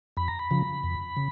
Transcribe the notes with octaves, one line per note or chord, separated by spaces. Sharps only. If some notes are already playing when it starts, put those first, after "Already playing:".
F2 B5
A#5
B5
C#3 F3
F2
C#3